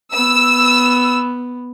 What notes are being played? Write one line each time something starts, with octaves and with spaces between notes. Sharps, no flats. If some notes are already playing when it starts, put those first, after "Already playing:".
B3 E6